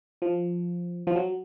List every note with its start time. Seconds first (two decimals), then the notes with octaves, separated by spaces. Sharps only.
0.22 F3
1.07 F3
1.15 F#3